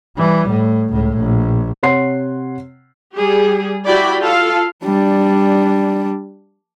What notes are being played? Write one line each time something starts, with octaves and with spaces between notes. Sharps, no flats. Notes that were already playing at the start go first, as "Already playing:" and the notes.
E3 G3
A2
C#2 A2
A#1
C3 C#5 F#5 C6 C7
G3 G4 G#4
E4 F#4 G4 D5 G5 B5
F4 A4 F5
G3 D4